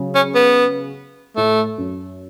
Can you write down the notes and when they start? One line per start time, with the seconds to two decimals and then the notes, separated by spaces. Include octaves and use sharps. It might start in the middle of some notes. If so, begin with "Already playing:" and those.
Already playing: C#3 F#3
0.15 C#4
0.35 B3
1.37 A2 A3
1.78 F#2